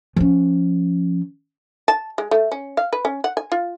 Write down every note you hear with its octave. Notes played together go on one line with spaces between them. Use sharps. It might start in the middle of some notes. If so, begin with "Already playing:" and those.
F3 C#4
A5
G#3
A3
C#4
F5
B4
C#4
F#5
G#5
F4